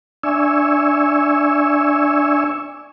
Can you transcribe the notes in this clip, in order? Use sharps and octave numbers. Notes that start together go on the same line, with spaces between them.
D4 D5 E5 G#5 C#6 E6